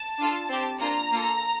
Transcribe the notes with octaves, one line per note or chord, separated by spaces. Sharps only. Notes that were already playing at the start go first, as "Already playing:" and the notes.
Already playing: A5
D4 F4 A4
C4 G4
A#3 D4 F4 A#5
A#3 F4 A4